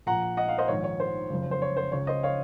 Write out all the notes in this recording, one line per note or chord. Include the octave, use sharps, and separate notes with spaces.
A#1 A#2 F#5 A#5
D#5 F#5
F5
C5 D#5
A#1 G#2 D#3 C#5
C#5
C5
F#1 F2 C#3
C5
C#5
C5
C#2 C#3 C#5
C5 D#5
C#5 F5